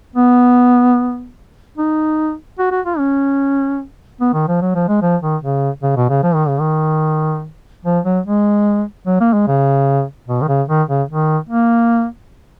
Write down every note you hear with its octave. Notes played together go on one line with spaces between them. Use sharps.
B3
D#4
F#4
F#4
F4
C#4
B3
D#3
F3
F#3
F3
G#3
F3
D#3
C#3
C#3
B2
C#3
F3
D#3
C#3
D#3
F3
F#3
G#3
F#3
A#3
G#3
C#3
B2
D#3
C#3
D#3
C#3
D#3
A#3